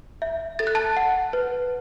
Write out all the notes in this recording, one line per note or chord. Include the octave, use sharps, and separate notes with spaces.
E5
A4 A6
F#6
A5 A6
F#5
B4